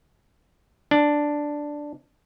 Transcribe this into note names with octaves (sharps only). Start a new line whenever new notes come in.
D4